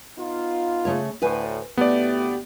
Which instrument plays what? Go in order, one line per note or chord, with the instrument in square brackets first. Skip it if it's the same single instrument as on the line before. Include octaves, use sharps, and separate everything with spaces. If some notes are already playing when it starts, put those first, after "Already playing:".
[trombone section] B3 D#4 F4
[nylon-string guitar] C#3 A3 C#5
[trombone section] D2 A2 [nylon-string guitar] B4 C5 G#5
[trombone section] D2 A2 G4 [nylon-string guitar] A3 [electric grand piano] B3 D5